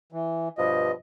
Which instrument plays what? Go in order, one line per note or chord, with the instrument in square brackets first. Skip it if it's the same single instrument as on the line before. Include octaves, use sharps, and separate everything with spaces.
[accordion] E3
[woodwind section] G2 B2 F3 [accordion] D#5